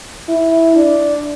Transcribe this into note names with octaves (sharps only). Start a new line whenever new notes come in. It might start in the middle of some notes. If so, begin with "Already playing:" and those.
E4
D4